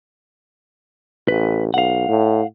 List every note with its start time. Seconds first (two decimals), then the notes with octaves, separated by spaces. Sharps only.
1.28 A1 B4
1.74 B1 F5 F#5
2.09 A2